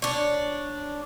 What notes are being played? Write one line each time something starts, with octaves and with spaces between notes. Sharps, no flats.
D4 C#5